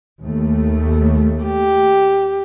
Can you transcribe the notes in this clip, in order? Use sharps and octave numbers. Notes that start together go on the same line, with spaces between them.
D#2 A3
G4